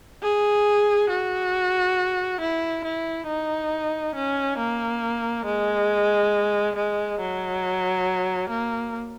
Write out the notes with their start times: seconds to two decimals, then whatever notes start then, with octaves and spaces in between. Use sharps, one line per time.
0.23 G#4
1.10 F#4
2.41 E4
2.84 E4
3.27 D#4
4.15 C#4
4.58 A#3
5.46 G#3
6.76 G#3
7.20 F#3
8.50 A#3